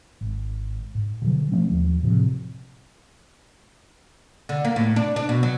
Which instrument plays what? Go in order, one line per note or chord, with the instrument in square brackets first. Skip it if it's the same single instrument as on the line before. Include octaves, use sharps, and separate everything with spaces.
[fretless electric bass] G#1
G#2
B2 D3 D#3 F#3
E3 F3 A3 C#4
D#2 F3 F#3
A2 C3 F3
[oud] D3
A#3
A2
D4
D4
B2
F#3